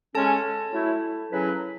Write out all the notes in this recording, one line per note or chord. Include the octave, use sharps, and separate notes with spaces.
C#3 G#3 C#4 A4 A5
F#3 A3 E4
C#3 F#3 C#4 E4 B4